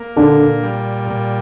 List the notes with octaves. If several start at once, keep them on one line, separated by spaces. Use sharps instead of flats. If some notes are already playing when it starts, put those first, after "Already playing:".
Already playing: A#3
A#2 D3 D4
G3
A#2